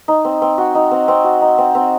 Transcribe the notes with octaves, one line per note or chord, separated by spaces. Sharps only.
D#4
C4
C4
F#4
D#4
C4
C4
F#4
D#4
C4
C4